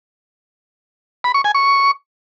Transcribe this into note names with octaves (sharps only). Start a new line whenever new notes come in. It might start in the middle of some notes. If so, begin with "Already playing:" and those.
B5
C#6
G#5
C#6